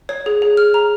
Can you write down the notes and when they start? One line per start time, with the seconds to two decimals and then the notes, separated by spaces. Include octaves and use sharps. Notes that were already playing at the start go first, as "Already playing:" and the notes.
0.09 C#5
0.26 G#4
0.42 G#4
0.57 F6
0.74 A#5